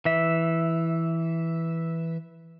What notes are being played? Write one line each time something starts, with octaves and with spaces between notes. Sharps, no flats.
E3 E5